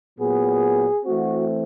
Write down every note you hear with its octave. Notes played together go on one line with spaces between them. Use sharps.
A#2 F#3 B3 G#4
E3 A3 C4 F#4